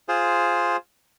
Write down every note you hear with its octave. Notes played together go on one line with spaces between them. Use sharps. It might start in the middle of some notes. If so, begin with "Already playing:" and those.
F4 G#4 C5